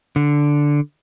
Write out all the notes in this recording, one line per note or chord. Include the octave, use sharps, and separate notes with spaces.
D3